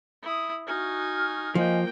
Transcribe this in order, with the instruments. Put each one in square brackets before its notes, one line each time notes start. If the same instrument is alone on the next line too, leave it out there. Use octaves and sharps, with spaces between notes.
[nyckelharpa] E4 D#6
[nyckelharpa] D#4 G#5 [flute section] F#4 F6
[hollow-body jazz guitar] F3 [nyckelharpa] A#3 G5 [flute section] D#5 G#5